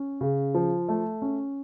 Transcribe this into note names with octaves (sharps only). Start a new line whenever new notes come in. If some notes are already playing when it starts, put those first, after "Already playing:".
Already playing: C#4
C#3
F3
A3
C#4